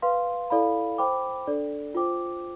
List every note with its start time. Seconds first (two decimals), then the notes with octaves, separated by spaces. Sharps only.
0.02 B4 F5 C6
0.50 E4 A4 D5 F5 B5
0.98 C5 G5 B5 D6
1.47 D4 A4 D5
1.95 F4 C5 G5 D6